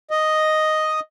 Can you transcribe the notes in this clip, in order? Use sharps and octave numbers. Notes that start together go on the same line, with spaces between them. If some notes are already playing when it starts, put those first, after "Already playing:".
D#5